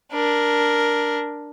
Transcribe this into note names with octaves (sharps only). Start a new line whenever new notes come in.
D4 A#4